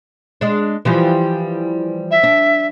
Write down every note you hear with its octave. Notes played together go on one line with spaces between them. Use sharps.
G#3 D4
E3 F3 G3
E5
D4